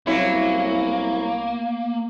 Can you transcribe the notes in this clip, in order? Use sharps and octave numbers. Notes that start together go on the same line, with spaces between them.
C2 F#3 A#3 C#4 E4